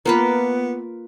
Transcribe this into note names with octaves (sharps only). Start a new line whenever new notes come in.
A#3 B3 F4 B4